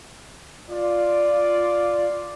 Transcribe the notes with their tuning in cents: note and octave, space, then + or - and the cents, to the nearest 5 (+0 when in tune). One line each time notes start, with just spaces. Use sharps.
F4 +0 D5 +0